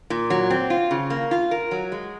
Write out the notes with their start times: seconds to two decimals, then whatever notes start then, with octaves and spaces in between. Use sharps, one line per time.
0.10 A#2
0.30 F#3
0.50 C4
0.70 F4
0.91 C#3
1.10 A#3
1.31 F4
1.51 A#4
1.71 F#3
1.92 G#3